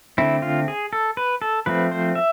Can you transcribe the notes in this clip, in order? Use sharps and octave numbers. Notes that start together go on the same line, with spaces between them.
D3 A3 C4 E4
F4
G#4
A4
B4
A4
F3 A3 C4 B4
C5
E5